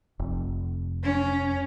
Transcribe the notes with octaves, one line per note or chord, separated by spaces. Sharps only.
F1
C#4